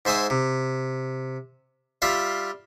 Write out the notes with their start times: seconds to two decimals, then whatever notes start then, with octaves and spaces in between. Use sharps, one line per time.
0.05 G#2 C5 E5 G#5 D#6
0.30 C3
2.02 G3 F4 E5 F5